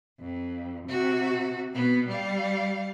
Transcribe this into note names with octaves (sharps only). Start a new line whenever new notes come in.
F2
C3 F#4
B2 B3
G3 F5